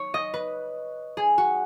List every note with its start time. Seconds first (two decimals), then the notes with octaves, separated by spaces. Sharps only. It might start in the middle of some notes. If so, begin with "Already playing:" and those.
Already playing: C#5
0.14 D#5
0.34 B4
1.17 G#4
1.38 F#4